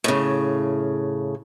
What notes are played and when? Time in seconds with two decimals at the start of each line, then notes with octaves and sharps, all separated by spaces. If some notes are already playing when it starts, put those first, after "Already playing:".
0.04 A2 C#3